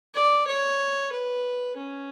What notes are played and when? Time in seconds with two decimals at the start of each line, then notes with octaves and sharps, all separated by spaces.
0.14 D5
0.47 C#5
1.12 B4
1.77 C#4